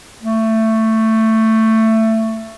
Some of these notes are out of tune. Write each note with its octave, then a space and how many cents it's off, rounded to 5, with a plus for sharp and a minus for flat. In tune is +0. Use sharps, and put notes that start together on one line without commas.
A3 +15